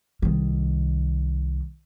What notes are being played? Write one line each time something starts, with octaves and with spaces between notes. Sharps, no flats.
C2 D#3